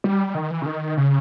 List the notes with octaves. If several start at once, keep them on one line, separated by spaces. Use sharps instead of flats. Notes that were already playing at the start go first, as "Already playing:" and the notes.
G3
D#3
E3
C#3
D#3
C#3